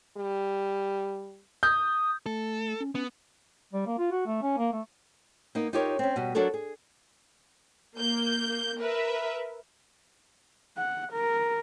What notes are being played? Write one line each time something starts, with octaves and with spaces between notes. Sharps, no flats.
G3
D#6 G6
A3 A4
C#4
B3 C#4
G3
A#3
F4
F#4
A3
C#4
A#3
A3
A#3 B3 D#4
D#4 F4 G4 A#4 C#5
C4 C#4
B2 G3 F#4
F#3 D4 F#4 A4 A#4
G#4
A#3 G6
A#4 B4 E5
F#5
A#4